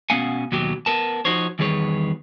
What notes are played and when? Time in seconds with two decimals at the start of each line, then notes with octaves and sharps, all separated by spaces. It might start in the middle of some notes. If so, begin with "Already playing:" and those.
0.10 B2 B3 C#4 F5 F#5 G#5
0.52 D#2 B2 F#3 G4
0.86 B3 A#4 A5
1.25 F3 D#4 F#4 C5 C#5
1.59 E2 D#3 G3 G#4 B4 C#5